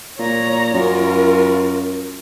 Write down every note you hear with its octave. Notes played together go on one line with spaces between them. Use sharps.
A#2 C#5 A#5
F#2 F4 A#4